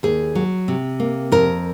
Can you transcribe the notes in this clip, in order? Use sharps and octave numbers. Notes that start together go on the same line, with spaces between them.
D#2 G#4
F#3
C3
A#3
F2 A#4